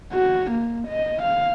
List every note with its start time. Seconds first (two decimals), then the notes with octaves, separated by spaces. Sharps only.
0.12 F#4
0.51 A#3
0.88 D#5
1.22 F5